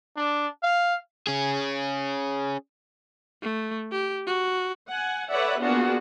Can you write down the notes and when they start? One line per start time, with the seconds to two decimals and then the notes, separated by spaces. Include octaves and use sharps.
0.17 D4
0.63 F5
1.27 C#4 G#4
3.42 A3
3.92 G4
4.27 F#4
4.88 F#5 G#5
5.31 A4 B4 C#5 D5 E5 F#5
5.61 A#3 B3 D4 F4 F#4 G#4